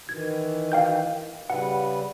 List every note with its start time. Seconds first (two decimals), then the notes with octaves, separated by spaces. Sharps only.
0.09 D#3 E3 G#6
0.72 F5 G5 G6
1.50 C#3 G3 B4 F#5